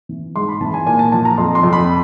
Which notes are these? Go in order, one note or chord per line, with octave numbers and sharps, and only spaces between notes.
E3
G#2 C6
B5
E3 A5
G#5
A#2 G#5
A5
F3 A5
A#5
F2 C6
C6
F2
B5